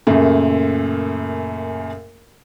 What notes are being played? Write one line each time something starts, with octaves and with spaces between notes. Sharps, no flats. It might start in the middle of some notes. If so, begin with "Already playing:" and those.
F#2 A#2 C#3 A3